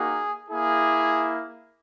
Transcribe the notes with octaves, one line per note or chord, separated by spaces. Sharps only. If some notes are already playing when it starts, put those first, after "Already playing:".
Already playing: A#3 D#4 F#4 G#4
A#3 E4 G#4